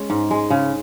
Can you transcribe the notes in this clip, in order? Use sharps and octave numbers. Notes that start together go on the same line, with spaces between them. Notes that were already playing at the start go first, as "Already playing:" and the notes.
Already playing: G#3 C#4
G#2
G#3
C#3